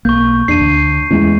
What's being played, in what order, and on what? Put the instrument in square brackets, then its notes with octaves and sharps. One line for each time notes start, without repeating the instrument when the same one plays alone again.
[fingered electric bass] B1 A#3 [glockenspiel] C#6 G6
[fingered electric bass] E2 [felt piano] D4 [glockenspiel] C7 D#7
[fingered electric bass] D2
[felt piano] E2 E4 [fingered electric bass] G#3 A3 C#4